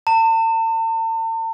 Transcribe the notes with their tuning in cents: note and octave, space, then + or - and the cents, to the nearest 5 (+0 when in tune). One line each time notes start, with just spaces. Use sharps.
A5 +45